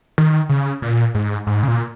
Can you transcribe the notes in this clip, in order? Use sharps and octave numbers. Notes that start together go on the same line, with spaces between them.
D#3
C#3
A#2
G#2
G#2
C#3
A#2